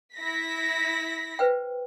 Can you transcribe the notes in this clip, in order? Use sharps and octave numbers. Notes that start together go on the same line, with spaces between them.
E4 A#6 B6
B4 C5 G5